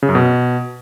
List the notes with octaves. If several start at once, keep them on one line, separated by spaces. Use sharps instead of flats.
C#3
F#2
B2